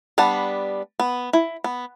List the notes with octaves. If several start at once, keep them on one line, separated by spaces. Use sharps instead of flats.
G3 B3 D4 F#5 A5
B3
E4
B3